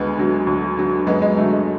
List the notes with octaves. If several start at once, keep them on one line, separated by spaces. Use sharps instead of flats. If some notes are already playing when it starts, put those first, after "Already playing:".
Already playing: D2 G#3 B3
D3 F#3
D2
D3 F#3
F#2 G#3 B3
G#3
D3 F#3 A3
G#3